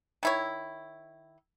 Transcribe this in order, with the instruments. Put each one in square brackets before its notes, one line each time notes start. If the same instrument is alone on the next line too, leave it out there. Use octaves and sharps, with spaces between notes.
[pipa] D#3 E4 C#5